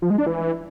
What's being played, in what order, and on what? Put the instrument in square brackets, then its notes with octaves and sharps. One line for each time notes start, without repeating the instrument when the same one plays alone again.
[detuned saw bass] F3
G#3
D4
E3